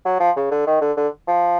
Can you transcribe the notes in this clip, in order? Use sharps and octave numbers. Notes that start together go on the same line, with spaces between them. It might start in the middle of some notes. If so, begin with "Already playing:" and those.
F#3
F3
C#3
D3
D#3
D3
D3
F3